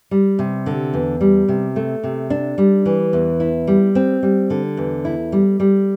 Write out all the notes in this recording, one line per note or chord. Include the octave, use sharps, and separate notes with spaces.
G3
C3
D3
E2
G3
C3
A3
C3
D4
G3
E3
E2
E4
G3
C4
G3
D3
E2
E4
G3
G3